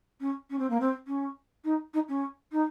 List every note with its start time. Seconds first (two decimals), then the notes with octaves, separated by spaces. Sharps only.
0.20 C#4
0.50 C#4
0.59 C4
0.70 A#3
0.80 C4
1.07 C#4
1.64 D#4
1.93 D#4
2.08 C#4
2.52 D#4